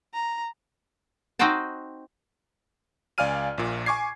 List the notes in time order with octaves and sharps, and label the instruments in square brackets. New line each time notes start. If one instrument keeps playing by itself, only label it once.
[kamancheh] A#5
[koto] C4 D#4 F#4 C5 G5 A5
[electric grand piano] C#2 D5 F5 G#5 F6 D#7
A#1 A#2
G#5 C#6 D6 G#6 C7